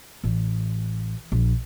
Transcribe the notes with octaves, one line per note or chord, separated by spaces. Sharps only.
A1
A#1